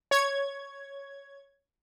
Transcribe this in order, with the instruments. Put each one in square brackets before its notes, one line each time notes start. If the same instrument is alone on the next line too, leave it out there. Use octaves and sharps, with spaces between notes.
[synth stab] C#5 G#6